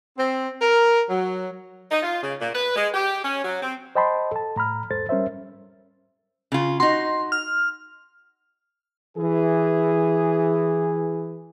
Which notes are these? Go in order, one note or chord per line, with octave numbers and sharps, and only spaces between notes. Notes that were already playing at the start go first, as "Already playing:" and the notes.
C4
A#4
F#3
D#4
F4
C#3
A#2
B4
G#3
G4
C#4
F#3
C4
C5 D#5 G5 A5 B5 C6
A4 A5
A2 A#5 B5 F6
E2 G#2 A4 C5 A6
G3 C#4 A#4 C5 E5
C#3 F4
D#4 F#4 C6
F6
E3 G#4